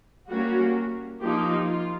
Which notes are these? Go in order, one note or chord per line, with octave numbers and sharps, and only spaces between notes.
G3 A#3 C#4 F#4
F3 A#3 D#4 G4
F4